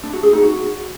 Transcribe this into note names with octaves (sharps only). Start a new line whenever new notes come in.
D4
F#4
G#4
D#4
F#4